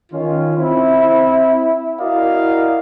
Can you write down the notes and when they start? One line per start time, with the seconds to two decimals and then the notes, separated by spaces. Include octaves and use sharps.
0.13 D#3 C#4 F4
0.57 C4 E4
2.01 E4 F#4 A#4 D5 D#5 F5